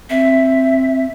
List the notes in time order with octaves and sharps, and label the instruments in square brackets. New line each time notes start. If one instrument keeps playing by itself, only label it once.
[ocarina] C4 [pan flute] E5